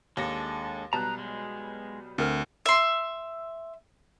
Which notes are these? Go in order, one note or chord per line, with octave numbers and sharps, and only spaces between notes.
D#2 G#3 D4 A4 A#6
B1 G3 B3 A5 A#5 F#6
G#3
D2 C4 A#4 F6
E5 C6